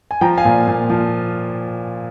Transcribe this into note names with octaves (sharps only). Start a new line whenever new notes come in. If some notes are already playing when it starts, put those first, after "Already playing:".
G#5
F3 G5 A#5
F5 G#5
A#2
A#2
F3